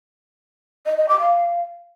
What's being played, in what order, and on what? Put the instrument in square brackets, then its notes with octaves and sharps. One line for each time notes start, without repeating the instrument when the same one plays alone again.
[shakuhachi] D#5
D#5
D6
F5